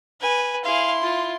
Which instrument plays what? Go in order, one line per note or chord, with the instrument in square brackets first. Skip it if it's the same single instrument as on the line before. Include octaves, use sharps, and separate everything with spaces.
[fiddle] B4 G#5
[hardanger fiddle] E4 C6 [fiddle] G#4 F5
[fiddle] F4